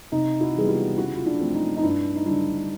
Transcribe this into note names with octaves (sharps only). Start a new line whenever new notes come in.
C3 D#4
E4 F#4
E3 G3 B3 G#4
F4 G4
C#3 E4 F#4
F4
D4 E4
F3 A3 C4
D#4
D#4
G2 D4 E4
D#4
D3 G3 D4 E4